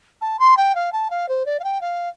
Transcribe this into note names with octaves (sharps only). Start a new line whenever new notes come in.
A5
C6
G5
F5
A5
F5
C5
D5
F5
G5
F5